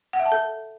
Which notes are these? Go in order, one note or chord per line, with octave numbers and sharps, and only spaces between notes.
F#5
E5
A5
A4